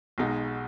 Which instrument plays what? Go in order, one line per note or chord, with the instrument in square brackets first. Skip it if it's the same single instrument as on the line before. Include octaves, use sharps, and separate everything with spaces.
[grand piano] B1 B2 G#3 D#4